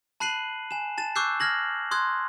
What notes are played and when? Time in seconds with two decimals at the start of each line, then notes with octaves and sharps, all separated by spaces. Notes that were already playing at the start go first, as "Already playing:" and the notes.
0.20 A5 B5 F#6 C7 D#7 F#7
0.71 G#5 E7
0.98 A5 A6 E7
1.15 C#6 D6 E6 F#6 G6 C7
1.40 F6 G#6 A#6 F#7
1.91 C6 D#6 F#6 G#6